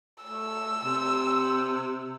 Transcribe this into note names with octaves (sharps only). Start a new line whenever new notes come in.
A3 E6
C3